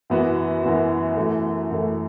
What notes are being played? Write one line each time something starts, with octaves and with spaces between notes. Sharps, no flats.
F#2 E3 B3 F#4
F#2 E3 B3 F#4
F#2 E3 A3
F#2 E3 A3